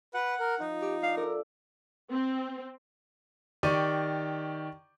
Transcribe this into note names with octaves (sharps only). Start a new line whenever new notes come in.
B4 F#5
A#4
F3 D#4
G4
D4 F5
A4 A#4 D5 E5
C4
D#3 G4 D5 C#6 D#7